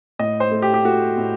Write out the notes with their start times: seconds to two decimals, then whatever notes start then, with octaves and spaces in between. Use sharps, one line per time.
0.19 A2 D#5
0.40 C5
0.51 A3
0.62 G4
0.74 G4
0.85 A3 F#4
1.18 A2